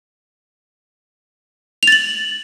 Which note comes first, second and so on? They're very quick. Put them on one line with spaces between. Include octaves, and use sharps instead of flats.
F7 A6 F#7